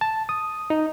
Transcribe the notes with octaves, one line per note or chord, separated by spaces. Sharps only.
A5
D#6
D#4